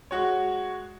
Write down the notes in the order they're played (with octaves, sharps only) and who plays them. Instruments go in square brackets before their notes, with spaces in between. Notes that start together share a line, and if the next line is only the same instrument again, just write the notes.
[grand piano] G#3 F#4 C#5